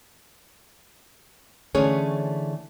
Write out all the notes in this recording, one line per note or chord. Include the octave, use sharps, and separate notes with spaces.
D3 E3 A3 C#4 G#4 C#5